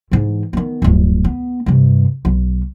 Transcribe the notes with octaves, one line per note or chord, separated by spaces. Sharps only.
G#2 E3
D#3 B3
D1 G1
B3
G2 C3
B1